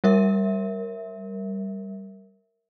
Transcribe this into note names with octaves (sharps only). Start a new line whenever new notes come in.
G3 A#4 E5